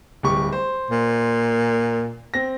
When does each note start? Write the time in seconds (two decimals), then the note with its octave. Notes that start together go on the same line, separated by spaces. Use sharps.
0.23 D1 G3 C#6
0.52 C5
0.91 A#2
2.34 C4 A#6